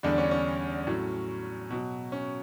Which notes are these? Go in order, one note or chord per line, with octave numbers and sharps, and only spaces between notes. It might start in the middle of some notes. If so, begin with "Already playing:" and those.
E2 D3 G3 D4
C#4
C#4
A2 F#3
B2 F#3
C#4